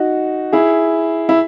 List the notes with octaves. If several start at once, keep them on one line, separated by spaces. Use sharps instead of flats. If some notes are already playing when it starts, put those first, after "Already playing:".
Already playing: D#4 F#4
E4 G#4
E4